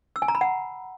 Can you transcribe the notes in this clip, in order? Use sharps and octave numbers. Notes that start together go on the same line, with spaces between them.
E6
G#5
A#5
B5
F#5